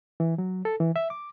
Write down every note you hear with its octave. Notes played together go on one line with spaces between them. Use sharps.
E3
F#3
A4
E3
E5
D6